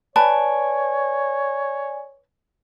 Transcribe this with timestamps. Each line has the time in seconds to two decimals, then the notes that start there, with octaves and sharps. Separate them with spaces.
0.16 B4 C#5 D5 G#5 A5 B5